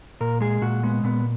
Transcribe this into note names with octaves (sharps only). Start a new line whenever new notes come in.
A#2 A#4
G#3 G#4
A#2 F#4
G#3 B3
A#2 B3